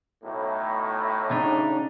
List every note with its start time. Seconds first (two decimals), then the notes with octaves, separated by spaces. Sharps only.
0.23 B1 A2
1.30 C#3 D4 D#4